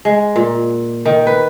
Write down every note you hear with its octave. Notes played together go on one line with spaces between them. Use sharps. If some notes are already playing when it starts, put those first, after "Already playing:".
G#3
A#2
D#3
B4